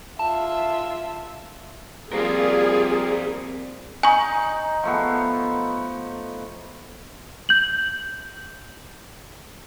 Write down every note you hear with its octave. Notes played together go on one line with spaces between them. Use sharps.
F4 E5 A5
F3 G3 A#3 C4 F4 G#4 A#4 D5
D#4 G#5 C#6
F3 A3 B3
G6 F#7